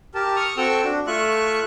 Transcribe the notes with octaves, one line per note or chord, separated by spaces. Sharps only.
G4 A#4 A5
C#6 D#6 F6
C4 F#4 A4 G5 C#6 E6
D4 F#4
A3 F4 E5 C#6 F#6